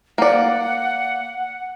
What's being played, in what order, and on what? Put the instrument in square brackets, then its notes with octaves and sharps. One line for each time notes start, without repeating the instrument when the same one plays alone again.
[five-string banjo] A#3 D5 [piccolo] F#5